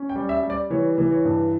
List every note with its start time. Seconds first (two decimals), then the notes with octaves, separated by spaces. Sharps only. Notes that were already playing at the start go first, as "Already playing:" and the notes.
Already playing: C#4
0.09 G5
0.16 G3
0.29 E5
0.43 G3
0.50 D5
0.70 E3 C#5
0.98 E3
1.12 C#5
1.25 G2